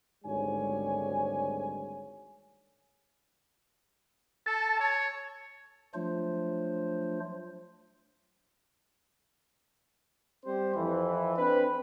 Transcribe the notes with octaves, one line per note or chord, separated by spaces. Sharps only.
G#1 D2 G#2 G3 C#5 G#5
A4 A5
C#5
F3 F#3 A3 D4 F4 C5
G3 C4 G4 C5
F2 E3
C4 D4 B4